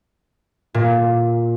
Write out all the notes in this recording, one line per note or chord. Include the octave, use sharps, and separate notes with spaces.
A#2